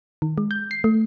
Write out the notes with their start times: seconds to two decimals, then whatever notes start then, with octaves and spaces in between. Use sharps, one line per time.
0.22 D#3
0.38 G#3
0.51 G6
0.71 C7
0.84 A3